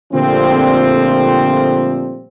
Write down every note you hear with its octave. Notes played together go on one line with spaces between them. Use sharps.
A#2 D3 F3 G3 A3 C4